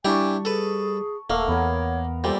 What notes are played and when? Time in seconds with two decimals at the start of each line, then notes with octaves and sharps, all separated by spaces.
0.05 G3 D4 E4 G4 G#5 A5 C#6
0.45 G#4 A4 B4
1.30 D#1 A3 A#3 A4 F5 F#5
1.48 E2 B3 A#4 C#5
2.24 A#2 G3 A4 C5 E5